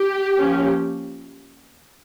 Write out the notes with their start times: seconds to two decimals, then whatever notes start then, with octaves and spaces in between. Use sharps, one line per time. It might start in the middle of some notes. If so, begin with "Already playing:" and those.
Already playing: G4
0.37 F3 A#3 C#4